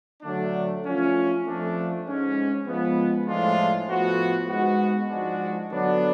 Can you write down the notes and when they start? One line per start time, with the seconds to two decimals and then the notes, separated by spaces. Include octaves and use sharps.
0.23 D3 F#3 A3 D4
0.83 F3 A3 C#4 F4
1.45 F2 F3 A3 D4 F4
2.06 G#2 G#3 C#4
2.66 F3 G#3 B3
3.27 A2 F3 G#3 D4 F4
3.88 A2 F3 B3 F#4
4.48 G#2 G#3 B3 F#4
5.09 G#2 F3 G#3 D4 F#4
5.70 D3 F#3 B3 D4